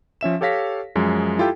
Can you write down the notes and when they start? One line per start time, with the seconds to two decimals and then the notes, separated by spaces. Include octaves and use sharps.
0.21 F3 C#4 E5 E7
0.41 G4 A4 C#5 F5 A#6 B6
0.96 F#2 F3 G#3
1.39 E4 F4 G4 A4 G5